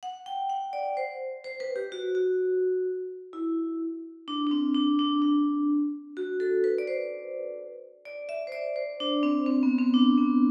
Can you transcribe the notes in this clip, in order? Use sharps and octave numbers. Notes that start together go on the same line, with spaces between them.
F#5
G5
F#5
D5
C5
C5
B4
G4
F#4
F#4
E4
D4
D4
C4
D4
D4
D4
F#4
A4
B4
D5
C5
D5
E5
C5
D5
C5
D4
C4
C4
B3
C4
D4
B3